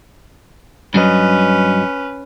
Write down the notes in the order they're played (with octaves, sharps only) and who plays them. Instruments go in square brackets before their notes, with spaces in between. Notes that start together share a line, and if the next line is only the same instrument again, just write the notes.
[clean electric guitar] G2 F#3 D#5 [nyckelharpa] C#4 B4